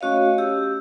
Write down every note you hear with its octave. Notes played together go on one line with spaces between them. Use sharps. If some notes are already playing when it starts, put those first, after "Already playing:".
A3 C#4 F#4 C#5 D#5 F5
G4 E6